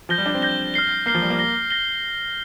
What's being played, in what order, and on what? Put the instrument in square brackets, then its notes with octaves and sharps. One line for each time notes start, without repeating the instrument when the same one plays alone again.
[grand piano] F3 [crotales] G6 A#6 G7
[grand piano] G3
D4
C4
[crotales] G6 A#6 G7
F6 C7 G7
[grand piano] A#3 [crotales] F6 C7 G7
[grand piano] F3
G3
A#3
[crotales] A#6 G7
A#6 G7